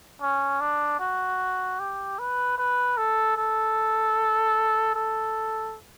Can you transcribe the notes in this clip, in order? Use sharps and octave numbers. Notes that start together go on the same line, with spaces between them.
C#4
D4
F#4
G4
B4
B4
A4
A4
A4